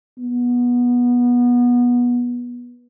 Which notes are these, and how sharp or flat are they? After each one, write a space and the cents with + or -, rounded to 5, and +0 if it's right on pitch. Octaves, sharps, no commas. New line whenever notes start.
B3 -20